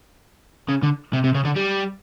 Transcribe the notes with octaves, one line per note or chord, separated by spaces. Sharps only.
C#3
D3
C3
C3
C#3
D3
G3